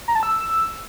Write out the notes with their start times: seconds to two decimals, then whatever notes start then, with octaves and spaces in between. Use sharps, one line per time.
0.08 A#5
0.15 A5
0.23 E6